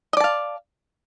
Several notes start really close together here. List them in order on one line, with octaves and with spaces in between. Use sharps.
D#5 D5 A5 F5